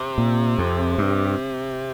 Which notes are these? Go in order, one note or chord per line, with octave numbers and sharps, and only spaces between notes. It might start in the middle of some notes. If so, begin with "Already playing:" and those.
Already playing: C3
A#2
F2
G2